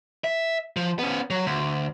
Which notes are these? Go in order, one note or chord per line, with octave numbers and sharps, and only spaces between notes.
E5
F3
B3 C#4
F#3
D2